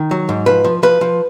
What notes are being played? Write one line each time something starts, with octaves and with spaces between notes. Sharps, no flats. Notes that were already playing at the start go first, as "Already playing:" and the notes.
Already playing: D#3
F#3
G#2
F3 B4
F3
F3 B4
F3